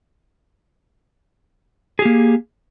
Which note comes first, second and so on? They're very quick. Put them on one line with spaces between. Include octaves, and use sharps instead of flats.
G#4 G4 A#3